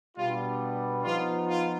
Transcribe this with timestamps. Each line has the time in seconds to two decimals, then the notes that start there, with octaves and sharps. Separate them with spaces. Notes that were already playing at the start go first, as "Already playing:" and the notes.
0.16 B2 G3 B3 D4 F4
1.03 F3 B3 D#4 F4
1.48 F4